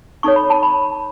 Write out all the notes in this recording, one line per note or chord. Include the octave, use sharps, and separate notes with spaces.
D#4 A4 C#5 C#6
B5
A5
B5